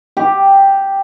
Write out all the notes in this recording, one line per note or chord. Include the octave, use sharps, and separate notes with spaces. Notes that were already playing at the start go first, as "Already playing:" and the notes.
G4